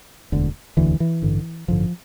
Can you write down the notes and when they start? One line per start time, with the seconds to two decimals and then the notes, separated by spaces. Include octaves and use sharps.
0.32 E1 D2 D3
0.77 E1 D2 D3 E3
1.00 E3
1.22 A1 G2 D3
1.68 A1 G2 D3 F3